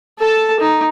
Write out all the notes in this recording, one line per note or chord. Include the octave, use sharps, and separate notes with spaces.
A4 A5
D#4